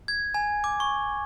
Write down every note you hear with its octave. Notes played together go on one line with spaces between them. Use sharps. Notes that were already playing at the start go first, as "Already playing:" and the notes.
G#6
G#5
D6
C#6